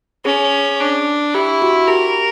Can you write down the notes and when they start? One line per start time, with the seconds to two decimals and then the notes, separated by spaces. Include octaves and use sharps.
0.25 C#4 G#4
0.80 D4
1.34 E4 G4
1.62 F#4
1.88 G4 A#4